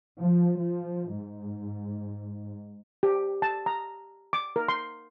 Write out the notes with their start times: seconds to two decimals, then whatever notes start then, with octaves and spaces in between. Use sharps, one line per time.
0.21 F3
0.60 F3
1.15 G#2
3.03 G4
3.42 A5
3.66 A#5
4.33 D6
4.56 A#4
4.68 C6